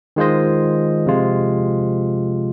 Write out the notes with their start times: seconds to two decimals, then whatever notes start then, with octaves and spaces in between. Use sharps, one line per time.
0.16 D#3 G#3 F4 C5 D#5
1.07 C3 F3 G#3 F4